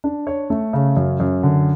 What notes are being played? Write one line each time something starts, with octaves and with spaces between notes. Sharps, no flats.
D4
C#5
A3
C#3
F#2
F#2
D3